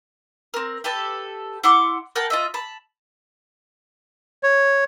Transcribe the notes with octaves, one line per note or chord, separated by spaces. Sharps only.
C4 A#4
G4 A4 B4 A5
E4 F#5 C6 D6
A#4 F#5 G5 A5
F4 D#5 E5
A5 B5
C#5